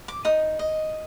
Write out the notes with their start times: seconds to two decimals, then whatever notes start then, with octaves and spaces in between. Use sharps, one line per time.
0.08 D6
0.25 D#4 D#6
0.59 D#5